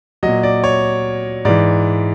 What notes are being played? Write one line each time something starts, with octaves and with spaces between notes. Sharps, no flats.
F#3 D#5
A#2
D5
C#5
G#2 E3 D5